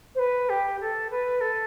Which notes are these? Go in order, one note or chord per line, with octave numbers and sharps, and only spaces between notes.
C5
B4
G4
A4
B4
A4